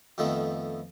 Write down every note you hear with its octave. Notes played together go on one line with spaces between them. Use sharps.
F2 D#3 F3 A3 B3